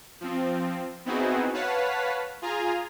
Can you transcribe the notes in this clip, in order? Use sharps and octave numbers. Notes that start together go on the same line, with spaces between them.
F3 C4
B3 C4 D#4 E4 F#4 G#4
B4 C#5 F5 F#5 A5 B6
F4 G#4 G#5 A#5